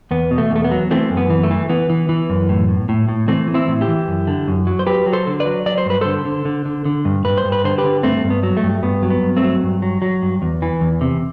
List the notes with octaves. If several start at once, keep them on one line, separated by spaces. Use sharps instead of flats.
E2 B3
B2
A3
E2
A3
B3
F#3
E3 A3 C4
F#2
B3
E3
A3
E3
E3 B3
E3
E3
F#2
A2
A2
A2
A2
E3 A3 C4
E3
C4 E4
A2
E4 G4
E3
F#2
D3
F#2
F#3
C5
F#3 G4 B4
F#3
A4 C5
D3
B4 D5
F#3
F#3 D5
C5
G2 B4
D3 A4 C5
D3
D3
D3
D3
G2
G2 B4
C5
G2
B4
D3 C5
G4 B4
D3
G2 A3 C4
G2
B3
F#3
A3
G2
G2 B3
F#3
B3
G2
A3 C4
F#3
G2
F#3
F#3
G2
E2
E3
E2
C3